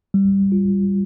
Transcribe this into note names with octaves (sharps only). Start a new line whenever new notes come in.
G3
F4